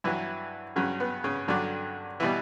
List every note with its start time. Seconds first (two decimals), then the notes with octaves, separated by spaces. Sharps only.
0.04 G2 E3 F#3 E4
0.76 G2 C#3 F#3 C#4
1.00 B3
1.24 C#3 C#4
1.48 G2 D3 F#3 D4
2.20 B2 E3 G3 E4